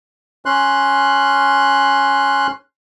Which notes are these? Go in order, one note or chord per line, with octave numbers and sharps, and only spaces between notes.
C#4 C6 F#6